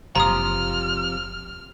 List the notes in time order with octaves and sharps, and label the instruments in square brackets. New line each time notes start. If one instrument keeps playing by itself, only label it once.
[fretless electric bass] F#1 [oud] C3 F3 F4 [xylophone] A#5 D#6 [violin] F6